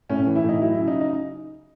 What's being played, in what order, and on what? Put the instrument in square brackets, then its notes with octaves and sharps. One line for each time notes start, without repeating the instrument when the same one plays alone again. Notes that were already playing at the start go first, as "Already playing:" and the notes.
[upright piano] A2 C#4
E3
E4
A2 D#4
F#3 E4
E4
C#3
D#4
D#4